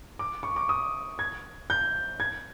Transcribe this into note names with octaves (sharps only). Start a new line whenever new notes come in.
D6
C#6
D6
D#6
G#6
G6
G#6